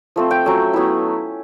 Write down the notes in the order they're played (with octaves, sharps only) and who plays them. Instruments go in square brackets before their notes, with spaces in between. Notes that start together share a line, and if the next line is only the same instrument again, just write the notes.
[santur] F3 A3 C4
G5
F#3 A3 C#4
F#3 B3 E4